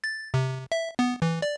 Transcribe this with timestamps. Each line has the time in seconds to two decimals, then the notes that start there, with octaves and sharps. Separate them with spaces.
0.04 A6
0.34 C3
0.72 E5
0.99 B3
1.22 E3
1.42 D5